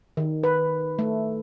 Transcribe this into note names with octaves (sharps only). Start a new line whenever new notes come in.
D#3
B4
A3